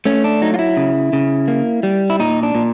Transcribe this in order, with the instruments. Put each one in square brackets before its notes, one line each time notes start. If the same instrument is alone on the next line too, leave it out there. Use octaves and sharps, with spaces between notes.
[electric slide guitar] A3 C#4
D4
F#3 D#4
F4
E4
C#3
C#3
A#3
G3
E4
A#2 D#4
D4
A#2